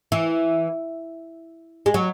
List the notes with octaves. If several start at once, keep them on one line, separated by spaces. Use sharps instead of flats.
E3
G#3
F#3